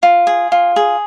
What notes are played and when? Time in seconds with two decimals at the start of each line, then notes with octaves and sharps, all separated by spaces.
0.03 F4
0.27 G#4
0.52 F4
0.76 G#4